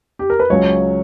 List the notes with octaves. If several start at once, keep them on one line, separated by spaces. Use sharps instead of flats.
G4
A#4
B4
C#2 C#3 F#3 C#5